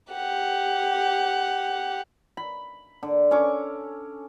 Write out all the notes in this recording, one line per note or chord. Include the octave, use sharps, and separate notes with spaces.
G4 F#5
B5
D3
C#4 A4 C#6 D6